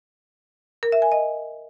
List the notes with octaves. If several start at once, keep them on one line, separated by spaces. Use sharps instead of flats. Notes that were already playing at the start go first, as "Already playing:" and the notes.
A#4
E5
G#5
D#5